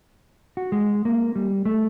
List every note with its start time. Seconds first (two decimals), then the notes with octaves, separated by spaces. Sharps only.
0.57 F#4
0.72 G#3
1.05 A#3
1.36 G3
1.65 A3